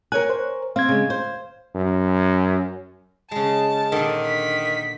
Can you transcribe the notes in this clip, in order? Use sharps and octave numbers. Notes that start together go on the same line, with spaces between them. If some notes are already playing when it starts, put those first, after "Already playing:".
A#4 C#5 G#5 F#6
C5
C4 F5 G#6
C#3 G#3
C5
F#2
C#3 G#3 A5
A#2 D3 D#3
B6